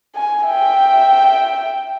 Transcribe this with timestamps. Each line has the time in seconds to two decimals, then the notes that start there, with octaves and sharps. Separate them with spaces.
0.15 G#5
0.47 E5 G5